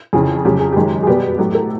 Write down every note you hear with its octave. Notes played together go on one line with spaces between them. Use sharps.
F2 C#3 E3 G#4
F2 C#3 F#3 G4
G#4
F#2 D#3 G#3 G4
G#4
B2 G3 B3 G4
A2 F#3 A3 G4
A4